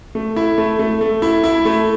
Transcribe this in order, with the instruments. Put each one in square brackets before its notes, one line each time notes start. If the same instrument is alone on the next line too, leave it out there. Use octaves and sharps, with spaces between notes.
[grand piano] A3
E4
A3
A3
A3
E4
E4
A3